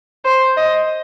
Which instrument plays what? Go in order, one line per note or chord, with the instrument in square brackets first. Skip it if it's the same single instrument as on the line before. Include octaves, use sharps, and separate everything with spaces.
[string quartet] C5
D#5